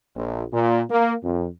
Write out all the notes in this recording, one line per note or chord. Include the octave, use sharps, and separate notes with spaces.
A#1
A#2
A#3
F2